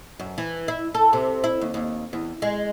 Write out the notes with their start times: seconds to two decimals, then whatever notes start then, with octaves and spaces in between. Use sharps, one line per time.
0.20 F#2
0.38 E3
0.68 E4
0.95 A4
1.13 C3
1.44 E4
1.61 D#2
1.74 D#2
2.13 E2
2.42 G#3